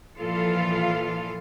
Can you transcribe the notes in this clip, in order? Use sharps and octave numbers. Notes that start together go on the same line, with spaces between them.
A#2 E3 F3 F4 A4 F5